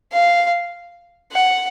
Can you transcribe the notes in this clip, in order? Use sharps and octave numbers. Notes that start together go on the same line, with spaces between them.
F5
F#5